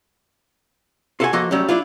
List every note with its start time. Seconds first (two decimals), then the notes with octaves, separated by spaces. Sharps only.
1.20 F4 F#4 A4 E5 F#5 G#5
1.33 F3 A#3 F#4 A4 D#5
1.51 F#3 G3 A3 C#4
1.69 D4 E4 F4